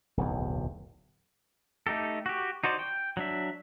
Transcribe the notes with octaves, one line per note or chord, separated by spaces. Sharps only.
D1 B1 E2
A3 D#4 G4 A4
F#4 G4
D#4 F#4 C5 D5
G5
F#3 D4 E5